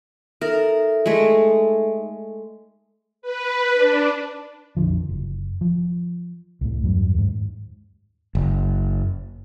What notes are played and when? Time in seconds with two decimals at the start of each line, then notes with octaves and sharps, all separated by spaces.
0.42 D#4 A4 A#4 E5
1.06 G#3 A3
3.22 B4
3.74 D4
4.77 A#1 F2 D3 F3
5.09 F#1
5.61 F3
6.61 C2 A2
6.83 E2 G2 F#3
7.14 D#2 G#2
8.35 F#1